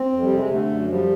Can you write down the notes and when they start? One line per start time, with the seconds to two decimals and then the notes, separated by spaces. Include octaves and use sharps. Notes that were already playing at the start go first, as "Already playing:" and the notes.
Already playing: C4
0.13 F2
0.23 G3
0.31 C3
0.36 G#3
0.50 D3 A3
0.70 F#2
0.88 F3 G3